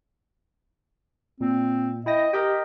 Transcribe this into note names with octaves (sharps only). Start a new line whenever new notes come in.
A#2 C4
E4 D#5 G5 A#6
G4 A#4 D#5 G5